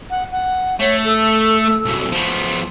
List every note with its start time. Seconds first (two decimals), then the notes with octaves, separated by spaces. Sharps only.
0.10 F#5
0.32 F#5
0.80 A3 C#5
1.05 A4
1.86 C2 F#2
2.12 F3 B3